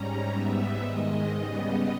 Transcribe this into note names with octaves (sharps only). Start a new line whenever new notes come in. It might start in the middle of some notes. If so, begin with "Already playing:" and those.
Already playing: G#2 G3 C#4 A#5
G#2 G3 B3 E5
G#2 D#3 G#3 D#5
C#3 G3 B3